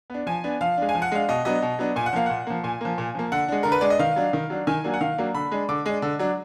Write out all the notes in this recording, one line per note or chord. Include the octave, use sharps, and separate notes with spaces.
B3 D4
F3 G#5
B3 D4
F3 F5
G#3 D4
G#5
F3
F#5
G#3 D4 F5
B2 D#5
F#3 B3 D4 D#5
B2
F#3 B3 D4
A#2 G#5
F#5
F3 A#3 F5
A#2 F#5
F3 A#3
A#2 G#5
F3 A#3
A#2
F3 A#3
D3 F#5
G#3 D4
D3 A#4
B4
G#3 D4 D5
D#5
D#3 F5
F#3 D4
D#3
F#3 D4
D#3 G#5
F#3 A#3 D4
F#5
D#3 F5
F#3 A#3 D4
D3 B5
G#3 D4
D3 D6
G#3 D4
D3
F#3 D4